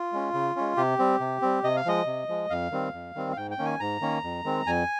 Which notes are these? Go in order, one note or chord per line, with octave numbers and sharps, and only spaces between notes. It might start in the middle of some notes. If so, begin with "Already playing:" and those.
Already playing: F4
G#3 C#4
C#3
G#3 C#4
C3 G4
G3 C4
C3
G3 C4
C3 D#5
F5
F3 G#3 D#5
C3
F3 G#3
F2 F5
D#3 G3 C4
F2
D#3 G3 C4
F5
G#2 G5
G5
D#3 A#3 C#4
G#5
G#2 A#5
D#3 A#3 C#4
F2
D#3 G#3 C4
F2 G#5